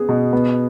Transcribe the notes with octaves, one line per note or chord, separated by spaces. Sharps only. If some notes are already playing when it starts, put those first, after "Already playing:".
Already playing: B3 G#4
B2
B3